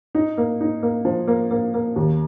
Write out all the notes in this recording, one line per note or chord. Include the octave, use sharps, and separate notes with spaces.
D#4
A#3
D#4
A#3
F3
A#3
A#3
A#3
D#2